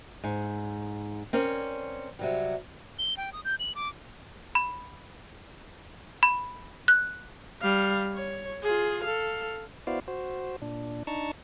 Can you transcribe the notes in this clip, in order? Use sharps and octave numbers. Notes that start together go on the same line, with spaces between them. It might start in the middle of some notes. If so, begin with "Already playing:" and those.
G#2
C4 C#4 A#4 C#5 D5
C3 F#3 G3
G7
G5
D#6
G6
F#7
D6
B5
B5
F#6
G3 F5
C#5
F4 G#4
A4 F5
B3 E4 F#4 C5 D5 F5
F#4 C5
A#2 D4
D4 D#4 A5 A#5 C#6